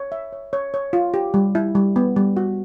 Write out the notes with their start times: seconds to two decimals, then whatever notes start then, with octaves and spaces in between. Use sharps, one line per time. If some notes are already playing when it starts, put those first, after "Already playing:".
Already playing: C#5
0.12 E5
0.33 C#5
0.53 C#5
0.74 C#5
0.93 F4
1.14 G4
1.34 G3
1.55 E4
1.75 G3
1.96 B3
2.16 G3
2.37 F#4